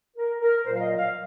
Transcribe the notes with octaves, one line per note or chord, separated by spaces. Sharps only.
A#4
A#4
A#2 F#3 C5
F5
D#5
F5